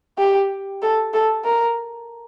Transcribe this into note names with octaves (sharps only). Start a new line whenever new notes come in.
G4
A4
A4
A#4